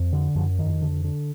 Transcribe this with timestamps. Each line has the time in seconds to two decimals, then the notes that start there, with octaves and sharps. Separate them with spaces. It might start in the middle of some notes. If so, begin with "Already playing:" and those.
Already playing: F2
0.13 D3
0.35 F#2 F3
0.58 F2 D#3
0.82 D3
1.04 D3